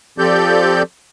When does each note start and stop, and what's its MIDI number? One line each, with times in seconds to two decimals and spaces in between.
0.18 0.82 53
0.18 0.82 60
0.18 0.82 67
0.18 0.82 69
0.18 0.82 74
0.18 0.82 91